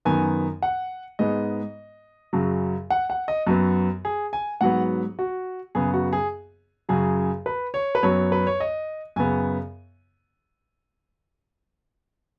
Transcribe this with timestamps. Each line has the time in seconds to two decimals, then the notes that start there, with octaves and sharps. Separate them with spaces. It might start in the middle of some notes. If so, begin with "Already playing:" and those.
0.05 F#2 D#3 B3 G#5
0.62 F#5
1.19 G#2 G#3 B3 D#5
2.33 F#2 C#3 F#3
2.90 F#5
3.10 F#5
3.28 D#5
3.47 F#2 F#3 B3
4.05 G#4
4.33 G#5
4.61 G#2 F#3 B3 F#5
5.19 F#4
5.75 F#2 C#3 B3 G#4
5.94 F#4
6.13 G#4
6.89 F#2 C#3 F#3 G#4
7.46 B4
7.74 C#5
7.95 B4
8.03 F#2 F#3 B3 C#5
8.32 B4
8.47 C#5
8.60 D#5
9.16 F#2 C#3 B3 G#5